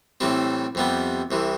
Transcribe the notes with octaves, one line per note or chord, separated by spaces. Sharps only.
A2 E3 G3 C4
F2 C3 G3 B3
C2 C3 E3